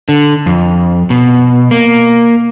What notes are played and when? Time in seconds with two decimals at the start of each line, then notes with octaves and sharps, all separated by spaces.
0.09 D3
0.46 F2
1.10 B2
1.71 A#3